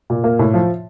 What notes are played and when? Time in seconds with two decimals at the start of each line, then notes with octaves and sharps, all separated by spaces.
0.10 A#2
0.24 A#3
0.39 A2
0.54 F3